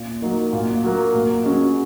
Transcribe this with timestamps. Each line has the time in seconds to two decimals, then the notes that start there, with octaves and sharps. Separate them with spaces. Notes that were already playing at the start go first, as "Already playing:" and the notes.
Already playing: A#2
0.22 F#3 A#3 D#4
0.53 A#2
0.83 F#3 A#3
1.14 A#2
1.44 F#3 C#4 G#4 D#5